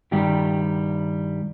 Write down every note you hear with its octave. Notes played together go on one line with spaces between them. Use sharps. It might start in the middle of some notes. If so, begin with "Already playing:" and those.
G2 D#3 G3 G4